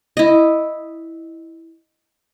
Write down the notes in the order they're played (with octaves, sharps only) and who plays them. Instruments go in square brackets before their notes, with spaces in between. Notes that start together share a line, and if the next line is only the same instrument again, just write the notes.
[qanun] E4 D#5